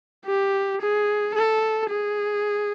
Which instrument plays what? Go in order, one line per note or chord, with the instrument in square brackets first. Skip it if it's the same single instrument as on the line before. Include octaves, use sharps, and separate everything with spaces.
[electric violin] G4
G#4
A4
G#4